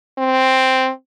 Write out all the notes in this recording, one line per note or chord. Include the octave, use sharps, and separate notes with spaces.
C4